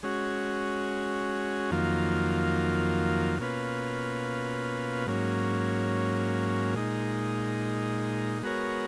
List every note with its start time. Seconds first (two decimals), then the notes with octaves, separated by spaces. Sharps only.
0.03 G#3 C#4 F#4
1.71 F2 D#3 F#3 A#3 F4
3.39 B2 A#3 C#4 F4 B4
5.07 G#2 F#3 A#3 C#4
6.74 A#2 G#3 D#4
8.43 G#3 B3 F#4 A#4 C#5